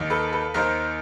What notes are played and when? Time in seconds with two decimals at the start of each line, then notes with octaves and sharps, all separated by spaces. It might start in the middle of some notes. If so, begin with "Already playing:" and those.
Already playing: D#2 D#3
0.10 A4 B4
0.32 A4 B4
0.54 D#2 D#3 A#4 C5